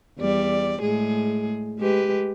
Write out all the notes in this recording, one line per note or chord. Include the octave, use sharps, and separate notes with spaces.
E2 G3 D5
A2 G#3 G#4
G#3 G4 B4